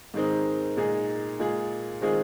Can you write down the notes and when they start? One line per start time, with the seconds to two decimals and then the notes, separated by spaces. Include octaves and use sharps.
0.14 G#2 D#3 G#3 C4 D#4
0.77 A#2 G#3 D#4 G#4
1.39 A#2 G#3 F4 G#4
2.01 D#3 G#3 C4 F4 G#4